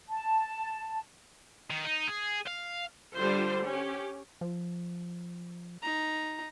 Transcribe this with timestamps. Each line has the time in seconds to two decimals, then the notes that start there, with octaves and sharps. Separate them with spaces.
0.09 A5
1.70 D#3
1.85 D#4
2.08 G#4
2.47 F5
3.16 D3 G3 F4 C5
3.62 C#4 G4
4.41 F3
5.82 D#4 A#5